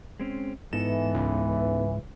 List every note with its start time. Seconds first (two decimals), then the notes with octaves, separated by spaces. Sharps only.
0.20 G#3 C4 C#4
0.73 G#2 E3 B3 D#4 A4 E7
1.14 C#2